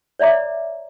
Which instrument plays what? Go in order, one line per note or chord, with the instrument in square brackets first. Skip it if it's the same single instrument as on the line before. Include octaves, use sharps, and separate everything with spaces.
[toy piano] C#5 D5 E5 A#5 D6